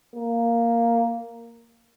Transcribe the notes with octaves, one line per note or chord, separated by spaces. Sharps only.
A#3